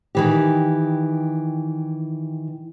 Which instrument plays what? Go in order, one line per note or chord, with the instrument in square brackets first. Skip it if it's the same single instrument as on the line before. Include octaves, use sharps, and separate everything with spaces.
[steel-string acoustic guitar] D#3 E3 G4